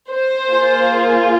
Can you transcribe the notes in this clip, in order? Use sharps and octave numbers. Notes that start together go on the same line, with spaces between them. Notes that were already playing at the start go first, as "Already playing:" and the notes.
C5
A#3 F4 G#4